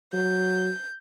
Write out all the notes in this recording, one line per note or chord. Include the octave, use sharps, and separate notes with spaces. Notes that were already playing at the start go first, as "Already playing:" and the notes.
F#3 G6